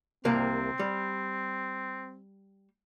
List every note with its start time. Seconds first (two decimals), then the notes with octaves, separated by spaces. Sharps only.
0.25 C2 C3 A#3 C4
0.79 G3